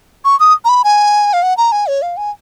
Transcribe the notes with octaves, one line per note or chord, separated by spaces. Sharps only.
C#6
D#6
A#5
B5
G#5
F5
F#5
A#5
G#5
C#5
F5
G#5